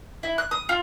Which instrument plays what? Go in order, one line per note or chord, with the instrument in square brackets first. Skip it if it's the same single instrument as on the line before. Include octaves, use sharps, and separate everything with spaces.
[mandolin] E4
F#6
D#6
F4